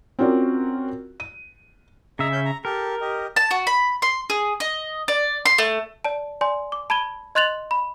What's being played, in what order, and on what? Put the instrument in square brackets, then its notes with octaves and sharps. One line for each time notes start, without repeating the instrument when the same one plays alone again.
[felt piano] C4 C#4 F4 F#4 A#4 D5
D#7
[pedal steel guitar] C#3 E5 [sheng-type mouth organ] G#4 D#5 A#5
[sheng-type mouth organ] C#4 G6
A#5
[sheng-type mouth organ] G4 A4 [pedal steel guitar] A#4
[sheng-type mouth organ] G4 D#5
[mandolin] A5
F#4
B5
C6
G#4
D#5
D5
C6
A3
[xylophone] D5 A5
D5 G#5 C6
D6
A5 B5 G#6 D#7 G7
D#5 C6 F#6 A6 F7 F#7
B5